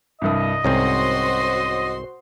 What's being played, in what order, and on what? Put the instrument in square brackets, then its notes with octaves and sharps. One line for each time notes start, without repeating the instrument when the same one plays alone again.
[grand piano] C2 G2 D#6 [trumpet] D#5
[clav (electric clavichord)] C2 G#2 C4 [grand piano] C#4 [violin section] F#4 C5 C6